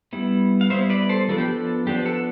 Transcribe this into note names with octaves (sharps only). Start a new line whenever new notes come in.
G3 B3 E4
F5
G3 B3 E4 C5 E5
B4 D5
A4 C5
F3 B3 D4 A4
G4
A4
F3 B3 D4 G4
A4